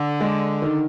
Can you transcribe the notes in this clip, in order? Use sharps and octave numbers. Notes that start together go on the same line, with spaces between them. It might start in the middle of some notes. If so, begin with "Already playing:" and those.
Already playing: D3
G#3
D#3